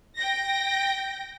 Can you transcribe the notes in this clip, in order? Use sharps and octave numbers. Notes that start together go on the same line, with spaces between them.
G5 A#6